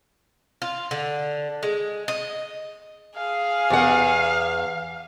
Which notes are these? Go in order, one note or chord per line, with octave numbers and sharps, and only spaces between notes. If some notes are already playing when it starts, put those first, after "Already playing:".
F4
D3
G#3
D#5
G#4 F5
E2 F#5